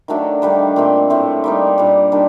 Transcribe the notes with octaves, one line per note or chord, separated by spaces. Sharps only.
D#3 F#3 A3 D4
D#3 G3 D4
A#2 A3 C4
A2 A3 C4
G3 A#3 D#4
A#2 G3 D4
D#3 G3 D4